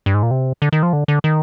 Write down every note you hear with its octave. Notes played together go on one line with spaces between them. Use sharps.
G2
G#2
A#2
C3
D3
D#3
F3
D3
D3
D#3